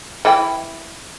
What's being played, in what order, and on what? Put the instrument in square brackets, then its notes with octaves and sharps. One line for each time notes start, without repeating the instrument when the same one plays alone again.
[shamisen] E3 E4 G5